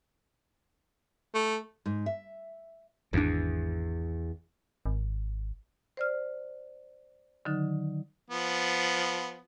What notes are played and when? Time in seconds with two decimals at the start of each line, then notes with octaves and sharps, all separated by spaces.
1.34 A3
1.86 G#2
2.06 E5
3.13 G#1 E2 D4
4.86 G#1
5.97 C5 D5 F6
7.45 D3 D#3 F#3 D#4
8.30 F3 B3